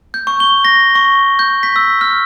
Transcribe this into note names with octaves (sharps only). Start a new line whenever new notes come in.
G6
C#6
G7
A#6
C#6
G6
B6
E6
F6